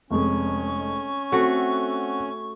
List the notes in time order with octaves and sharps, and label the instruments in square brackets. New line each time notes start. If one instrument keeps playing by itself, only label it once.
[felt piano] F1 F2 G#3 [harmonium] C#4 [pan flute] C#6
[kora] A3 F#4 [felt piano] C4 A4 F#5